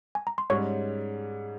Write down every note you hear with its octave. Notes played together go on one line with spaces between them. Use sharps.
G#5
A#5
C6
G#2 G3 C#4 C#5 C#6